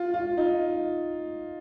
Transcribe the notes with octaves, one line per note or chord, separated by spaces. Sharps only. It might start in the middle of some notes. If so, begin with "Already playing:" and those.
Already playing: F4
F4
D#4